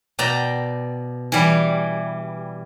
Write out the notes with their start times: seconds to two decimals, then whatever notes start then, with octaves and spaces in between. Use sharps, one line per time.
0.19 B2 D5 G5 A#5
1.32 E3 G3